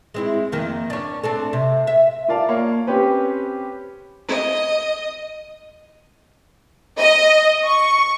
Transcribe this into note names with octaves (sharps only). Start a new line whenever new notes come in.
G#3 C4 E4
F2 D#3 A#3
C#4 D4
C4 D4 A4
C3
E5
F4 A#4 D5 F5 A5
A#3 C#5 F5
C4 C#4 G4 B4 C5
D#5
D#5
C#6